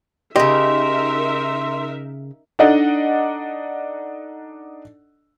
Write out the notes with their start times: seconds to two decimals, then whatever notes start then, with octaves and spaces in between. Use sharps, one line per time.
0.36 C#3 D#4 G4 A#4 D#5 E5 C6
2.59 D4 D#4 A4 D5 D#5 F#5